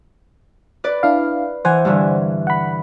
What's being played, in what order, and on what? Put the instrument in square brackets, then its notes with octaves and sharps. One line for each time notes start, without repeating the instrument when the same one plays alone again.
[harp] B4 D5
[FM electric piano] D4 E4 F5
[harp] E3 [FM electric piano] C5 F#5 G#5
[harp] G2 D3 E3
[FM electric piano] F#5 B5